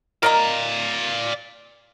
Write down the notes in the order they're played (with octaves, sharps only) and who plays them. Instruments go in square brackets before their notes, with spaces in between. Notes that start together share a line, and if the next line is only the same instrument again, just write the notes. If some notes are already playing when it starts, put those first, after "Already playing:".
[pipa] A#4 D#5 A#5 [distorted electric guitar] D5 F5